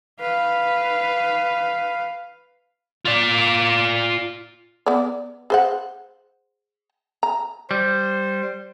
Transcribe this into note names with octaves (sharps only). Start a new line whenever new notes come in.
B4 F5
F4 D5
B3 D5
G#4 C5 F#5
A#5
G3 C5